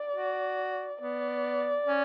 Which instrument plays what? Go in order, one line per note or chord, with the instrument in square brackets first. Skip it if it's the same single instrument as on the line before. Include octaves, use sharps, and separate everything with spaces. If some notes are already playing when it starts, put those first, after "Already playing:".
Already playing: [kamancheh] D5
[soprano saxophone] F#4
[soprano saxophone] B3 [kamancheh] D5
[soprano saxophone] C#4